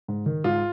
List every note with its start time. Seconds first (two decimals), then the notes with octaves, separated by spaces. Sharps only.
0.08 G#2
0.26 D#3
0.44 G#2 F4